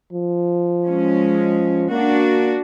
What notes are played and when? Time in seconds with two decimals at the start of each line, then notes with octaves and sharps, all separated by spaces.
0.13 F3
0.86 G#3 C#4
1.91 A#3 D4 F#4